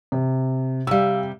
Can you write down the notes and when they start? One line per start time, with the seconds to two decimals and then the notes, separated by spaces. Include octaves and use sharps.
0.12 C3
0.87 C3 G3 F5 E6